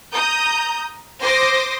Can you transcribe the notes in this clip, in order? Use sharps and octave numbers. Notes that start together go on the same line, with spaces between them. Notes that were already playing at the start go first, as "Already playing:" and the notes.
A#5 D#6 G6
C5 C6 D6 D#6 A#6